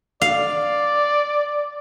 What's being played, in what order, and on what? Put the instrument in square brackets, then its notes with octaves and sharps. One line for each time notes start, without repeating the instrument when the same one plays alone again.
[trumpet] D5 [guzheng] F5